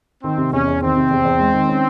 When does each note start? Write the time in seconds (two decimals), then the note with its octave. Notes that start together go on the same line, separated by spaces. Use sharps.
0.23 D#3 C4
0.38 C3
0.53 E2 C#4
0.67 E2
0.82 D#3 C4
0.96 C3
1.11 E2
1.25 E2
1.40 G#3
1.54 D#3
1.68 C#4